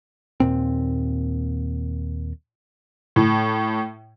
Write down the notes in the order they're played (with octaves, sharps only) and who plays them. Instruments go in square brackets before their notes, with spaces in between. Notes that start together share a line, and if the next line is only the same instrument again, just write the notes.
[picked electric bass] D#2 A#2 C4
[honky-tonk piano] A2